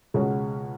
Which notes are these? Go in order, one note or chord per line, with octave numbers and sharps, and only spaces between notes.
C#2 B2 G#3 C#4 F#4